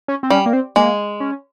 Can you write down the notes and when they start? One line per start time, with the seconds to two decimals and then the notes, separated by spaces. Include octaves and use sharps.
0.08 C#4
0.23 C4
0.30 G3 C#4
0.46 A#3
0.53 C4
0.76 G#3 A#3
1.20 C#4